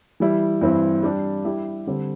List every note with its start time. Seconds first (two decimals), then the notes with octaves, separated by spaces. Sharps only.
0.20 E3 G3 E4
0.61 G2 E3 C4 E4
1.03 G3 D4 G4
1.45 G3 E4 G4
1.87 D3 G3 C4